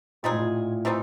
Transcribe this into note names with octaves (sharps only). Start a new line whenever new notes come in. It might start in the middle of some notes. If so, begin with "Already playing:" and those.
A#2 G3 C4 D#4 G#4
A2
A#2
E3 G3 C4 D#4